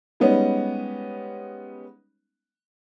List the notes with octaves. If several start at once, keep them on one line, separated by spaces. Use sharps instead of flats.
G3 G#3 B3 C#4 D#4